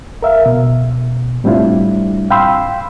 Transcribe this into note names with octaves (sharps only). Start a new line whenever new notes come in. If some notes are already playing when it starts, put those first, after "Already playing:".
A#4 E5 F5
B2
A2 G3 C4 D4 E4 F4
F5 G5 B5 C6 E6